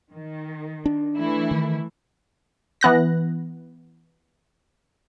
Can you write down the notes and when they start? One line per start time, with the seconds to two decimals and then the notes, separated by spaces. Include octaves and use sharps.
0.11 D#3
0.86 D4
1.17 E3 A3 E4
1.51 D#3
2.81 E3 B3 F#6 A#6